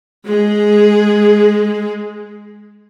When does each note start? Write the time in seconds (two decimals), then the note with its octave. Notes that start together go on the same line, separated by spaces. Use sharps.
0.25 G#3 G#4